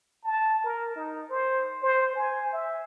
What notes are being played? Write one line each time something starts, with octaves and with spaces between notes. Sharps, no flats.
A5
A#4
D#4
C5
C5
G#5
E5